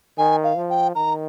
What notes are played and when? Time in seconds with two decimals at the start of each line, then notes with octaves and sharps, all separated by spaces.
0.18 D#3 G#5
0.44 F5
0.56 F3
0.70 G5
0.95 D#3 A#5